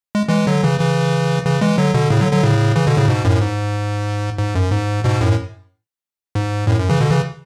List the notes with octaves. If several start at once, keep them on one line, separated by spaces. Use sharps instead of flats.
G#3
E3 G#3
D3 F#3
C#3 E3
C#3 E3
C#3 E3
E3 G#3
D3 F#3
B2 D3
A2 C#3
D3 F#3
D3 F#3
A2 C#3
C#3 E3
B2 D3
A2 C#3
G#2 B2
F#2 A2
G#2
G#2
F#2
G#2
G#2 B2
F#2 A2
G#2
F#2 A2
F#2
C#3 E3
B2 D3
C#3 E3